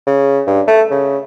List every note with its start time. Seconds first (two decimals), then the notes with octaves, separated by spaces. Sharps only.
0.07 C#3
0.47 G2
0.67 A3
0.91 C#3